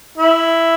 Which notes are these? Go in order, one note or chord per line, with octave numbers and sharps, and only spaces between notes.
E4